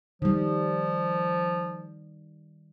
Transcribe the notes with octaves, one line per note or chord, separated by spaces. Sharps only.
D#3 F3 G3